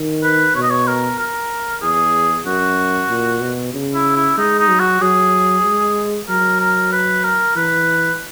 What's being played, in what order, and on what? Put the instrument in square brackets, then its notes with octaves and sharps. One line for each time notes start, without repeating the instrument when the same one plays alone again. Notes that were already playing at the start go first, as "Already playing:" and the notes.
Already playing: [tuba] D#3
[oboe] B4
[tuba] B2 [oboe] C#5
[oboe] D#5
C#5
A#4
A#4
[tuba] E2 [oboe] G#4
[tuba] F#2 [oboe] F#4
[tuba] A#2
B2
C#3
[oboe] E4
E4
[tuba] G#3 [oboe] D#4
[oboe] D#4
[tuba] F#3
[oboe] F#4
[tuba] F#3 [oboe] G#4
[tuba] G#3
[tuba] F#3 [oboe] A#4
[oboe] A#4
B4
A#4
[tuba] E3 [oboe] B4